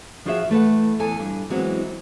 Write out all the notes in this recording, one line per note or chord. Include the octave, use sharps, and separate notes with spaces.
F3 F4 F#4 G#4 C#5 E5
E3 A3 B4 F#5
E2 E3 A4 G#5
G2
E3 F#3 G#3 B3 C4 F#4